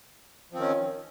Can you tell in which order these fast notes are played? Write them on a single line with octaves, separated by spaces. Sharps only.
F3 C4 D#3 C#4